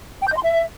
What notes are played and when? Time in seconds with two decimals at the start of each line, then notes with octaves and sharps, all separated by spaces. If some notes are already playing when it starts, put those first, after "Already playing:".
0.22 G5
0.27 G6
0.32 D#5
0.37 C6
0.42 E5